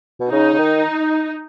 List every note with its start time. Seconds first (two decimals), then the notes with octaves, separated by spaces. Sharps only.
0.20 B2
0.31 C#3 D#4
0.53 C#3
0.58 D#3